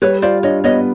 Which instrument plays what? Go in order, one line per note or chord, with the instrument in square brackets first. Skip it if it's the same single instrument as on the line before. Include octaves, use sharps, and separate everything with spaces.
[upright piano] G3 [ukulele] B4 C#5
[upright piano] F4 [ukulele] C5 D5
[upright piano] D4 [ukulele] C#5 D#5
[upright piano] B3 [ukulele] C#5 D#5